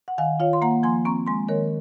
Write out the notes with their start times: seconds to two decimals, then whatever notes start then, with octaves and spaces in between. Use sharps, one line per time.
0.08 F#5
0.18 D#3 F5 G#5
0.40 F4 C#5 F5
0.53 C6
0.62 A#3 F#5 A#5
0.83 F3 G#5 C6
1.05 C4 A#5 C#6
1.26 G#3 G#5 C6
1.49 D#3 A#4 C#5